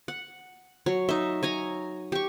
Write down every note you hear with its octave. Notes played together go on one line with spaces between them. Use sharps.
F#5
F#3 C#5
D#4 E5
C#5 G#5 A#5
G4 C#6